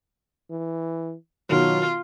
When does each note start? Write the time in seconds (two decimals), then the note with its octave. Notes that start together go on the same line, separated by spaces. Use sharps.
0.51 E3
1.50 B2 D#3 F#3 F4